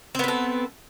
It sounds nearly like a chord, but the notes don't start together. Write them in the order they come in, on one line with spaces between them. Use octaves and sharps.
C4 B3 B4 A4